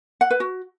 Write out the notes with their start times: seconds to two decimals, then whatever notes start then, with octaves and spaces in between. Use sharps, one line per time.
0.21 F#5
0.31 B4
0.40 F#4